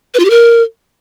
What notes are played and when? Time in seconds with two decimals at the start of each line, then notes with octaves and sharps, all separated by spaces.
0.14 B4
0.20 F4
0.25 G4
0.30 A#4